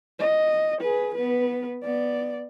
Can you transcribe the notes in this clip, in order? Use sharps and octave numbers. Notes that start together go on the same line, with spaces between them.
D#5
G#4 B4
B3 B4
B3 D5